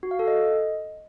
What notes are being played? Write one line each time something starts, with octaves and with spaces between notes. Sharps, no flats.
F#4
F5
A4
D#5